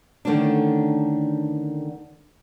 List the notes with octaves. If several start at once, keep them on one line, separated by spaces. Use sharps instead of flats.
D3 D#3 A3 C#4 D4